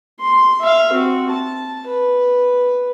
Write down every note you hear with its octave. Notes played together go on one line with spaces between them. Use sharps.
C6
E5 F5
C4 F#4
A5
B4